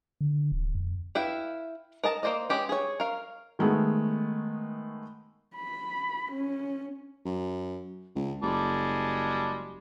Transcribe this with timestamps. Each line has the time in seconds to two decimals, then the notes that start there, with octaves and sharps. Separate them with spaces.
0.21 D3
0.52 D1
0.75 F2
1.15 E4 B4 E5 F5 G5
2.04 A#4 D#5 A5 A#5
2.23 A#3 A4 C5 D5 D#5
2.49 G#3 C#4 G4 B4
2.69 G#4 C#5
3.00 A#4 F5
3.59 D#3 G#3 A3 B3
5.56 B5
6.32 C#4
7.25 F#2
8.16 C#2
8.42 F#1 G3 G#3 A5